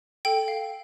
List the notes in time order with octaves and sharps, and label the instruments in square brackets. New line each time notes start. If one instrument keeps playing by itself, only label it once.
[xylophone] A4 G5
F5